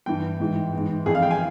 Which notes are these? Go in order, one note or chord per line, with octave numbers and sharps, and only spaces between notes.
G2 E3 G5
G#2 E3
G#2 E3
F2 E3 G#4
F5
G5
G#5